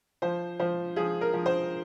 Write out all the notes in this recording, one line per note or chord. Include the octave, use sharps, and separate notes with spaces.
F3 C5
F3 C5
F3 G#4
A#4
F3
C5